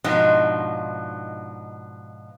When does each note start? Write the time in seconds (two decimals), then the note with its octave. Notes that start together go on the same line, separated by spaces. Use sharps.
0.04 G#2 B2 F3 D4 D#4